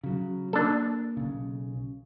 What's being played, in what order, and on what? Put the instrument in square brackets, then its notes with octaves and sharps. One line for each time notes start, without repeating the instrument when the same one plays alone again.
[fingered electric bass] C#3 F#3
[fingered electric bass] A#3 [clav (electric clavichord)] D4 A4
[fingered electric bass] B1 C#3